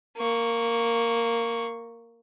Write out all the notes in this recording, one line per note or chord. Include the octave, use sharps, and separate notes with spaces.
A#3 C#6